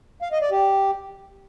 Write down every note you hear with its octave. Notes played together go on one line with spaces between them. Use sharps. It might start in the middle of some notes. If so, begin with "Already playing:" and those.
F5
D#5
D5
G4